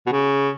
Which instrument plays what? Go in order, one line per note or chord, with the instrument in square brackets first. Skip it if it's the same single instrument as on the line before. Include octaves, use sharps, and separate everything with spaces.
[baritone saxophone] B2
C#3